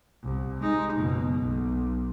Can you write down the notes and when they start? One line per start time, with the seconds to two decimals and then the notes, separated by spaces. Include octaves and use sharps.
0.23 C2
0.60 G#3 D#4
0.95 F#1 B2
1.40 B1